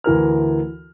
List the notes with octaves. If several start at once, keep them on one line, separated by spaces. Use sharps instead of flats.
D2 E3 A#4 F6